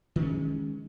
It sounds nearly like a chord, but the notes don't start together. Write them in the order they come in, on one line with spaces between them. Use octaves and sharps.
D#3 D4 C#4 G#3